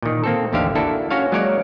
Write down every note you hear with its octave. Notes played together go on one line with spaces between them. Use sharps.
A#2 D#3
A#3 C4 A4
A1 D#2 D3 G4 E5 F5
A#3 D4 E4 F#4 A4
C#4 F#4 C#5 F5
F#3 G#3 A#3 A#4 C#5 D5